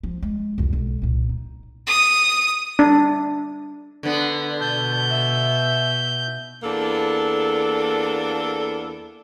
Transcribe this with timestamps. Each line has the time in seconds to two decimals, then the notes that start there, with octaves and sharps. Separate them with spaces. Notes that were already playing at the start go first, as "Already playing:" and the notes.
0.03 F3
0.22 G#3
0.58 C2 F2
0.73 B1 G#3
1.02 C2 A#2
1.29 D#4
1.87 D#6
2.79 D4
4.03 D3 B3 B4
4.61 B2 A5 G6
5.10 E5
6.63 E2 A#3 D4 A4